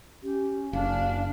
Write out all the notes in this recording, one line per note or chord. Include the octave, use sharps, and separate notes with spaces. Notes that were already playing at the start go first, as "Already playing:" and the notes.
C#4 G4
F#1 D4 F5